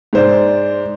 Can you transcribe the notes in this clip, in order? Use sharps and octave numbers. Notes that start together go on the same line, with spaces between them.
G#2 C5 D5